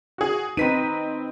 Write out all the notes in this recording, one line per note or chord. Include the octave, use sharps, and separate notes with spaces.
F#4 G#4
C4 D#4 B4 B6 D#7